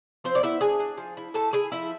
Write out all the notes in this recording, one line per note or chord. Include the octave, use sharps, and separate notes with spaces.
F3 C4 C5
D5
B3 E4 E5
D4 G#4 G#5
D4
F3
E4
A2 A4 A5
E4 G#4 G#5
F3 E4 E5